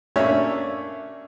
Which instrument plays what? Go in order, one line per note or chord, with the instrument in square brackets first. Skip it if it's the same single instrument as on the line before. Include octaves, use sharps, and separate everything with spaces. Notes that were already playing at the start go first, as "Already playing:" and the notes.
[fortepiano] A3 A#3 C#4 D4 C#5 E5